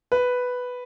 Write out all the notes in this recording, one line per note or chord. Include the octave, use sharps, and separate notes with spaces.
B4